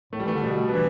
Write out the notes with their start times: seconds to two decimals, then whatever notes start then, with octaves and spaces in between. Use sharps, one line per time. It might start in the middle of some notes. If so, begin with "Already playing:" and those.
0.13 A2 A3
0.20 G3
0.25 E3 A3
0.34 D3
0.43 B2 G3
0.69 B3
0.73 E3 D4